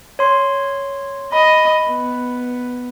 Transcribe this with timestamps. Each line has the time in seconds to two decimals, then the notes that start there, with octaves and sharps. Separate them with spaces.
0.19 C#5 C6
1.32 D#5 B5
1.89 B3